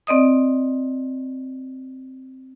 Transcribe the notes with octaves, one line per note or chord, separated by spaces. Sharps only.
C4 D5 D#5 D#6